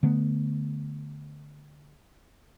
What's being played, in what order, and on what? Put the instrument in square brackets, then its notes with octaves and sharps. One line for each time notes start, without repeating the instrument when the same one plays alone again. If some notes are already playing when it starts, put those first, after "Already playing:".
[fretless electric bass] D3 A3 B3